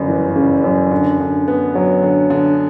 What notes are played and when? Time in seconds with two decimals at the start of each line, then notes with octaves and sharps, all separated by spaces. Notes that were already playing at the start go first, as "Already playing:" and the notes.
Already playing: G1 F#2 C#3
0.08 E3
0.36 C#3
0.64 F#2
0.91 D3
1.20 D3
1.48 B3
1.75 F#3
2.03 D3
2.30 D3